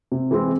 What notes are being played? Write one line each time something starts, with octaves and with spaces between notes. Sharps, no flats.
C3
E3 G#3 C4 E4